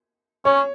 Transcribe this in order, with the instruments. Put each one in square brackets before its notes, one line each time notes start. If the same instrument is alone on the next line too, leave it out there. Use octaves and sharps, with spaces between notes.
[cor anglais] C#4 [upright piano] C#5